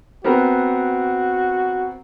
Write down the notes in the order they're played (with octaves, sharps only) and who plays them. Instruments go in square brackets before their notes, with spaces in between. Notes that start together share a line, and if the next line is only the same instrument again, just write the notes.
[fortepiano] B3 C4 A#4 [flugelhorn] F#4